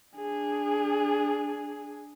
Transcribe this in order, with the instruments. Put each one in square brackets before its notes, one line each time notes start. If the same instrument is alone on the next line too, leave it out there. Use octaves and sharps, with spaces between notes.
[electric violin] D4 G#4